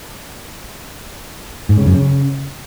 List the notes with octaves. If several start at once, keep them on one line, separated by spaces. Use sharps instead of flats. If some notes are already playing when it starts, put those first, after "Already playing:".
G#2
C#3
F#2
C#3